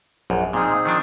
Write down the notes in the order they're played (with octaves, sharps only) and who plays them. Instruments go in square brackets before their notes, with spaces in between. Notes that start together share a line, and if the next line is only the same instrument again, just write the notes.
[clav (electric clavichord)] A#1 F#2
[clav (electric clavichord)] A#2 F3 [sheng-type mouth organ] C4 D#4 G#4
[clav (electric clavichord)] D#3 F3 D4